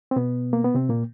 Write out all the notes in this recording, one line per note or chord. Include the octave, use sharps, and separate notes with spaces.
C4
B2 B3
A#3
B3
C3 C4
A#2 A#3